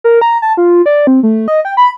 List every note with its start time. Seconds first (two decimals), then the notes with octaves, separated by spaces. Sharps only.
0.04 A#4
0.21 A#5
0.42 A5
0.57 F4
0.86 D5
1.07 C4
1.23 A3
1.48 D#5
1.65 G5
1.77 B5